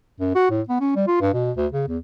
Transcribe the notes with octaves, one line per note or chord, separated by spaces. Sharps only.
F#2
F#4
A2
B3
C#4
G3
F4
G2
B2
D2
C#3
E2